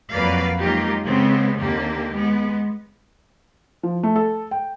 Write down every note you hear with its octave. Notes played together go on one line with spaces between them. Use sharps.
F2 F#3 A#3 B4 D5 F5
F#3 G#3 A#3 D#4 F4 G4
C#3 G#3 B3 C4
D#2 D3 A#3 G4
G#3 B3
F3
A3
A4
G5